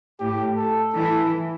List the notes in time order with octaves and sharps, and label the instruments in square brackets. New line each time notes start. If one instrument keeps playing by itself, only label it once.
[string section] A2 [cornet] G4
[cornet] A4
[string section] E3 [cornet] A4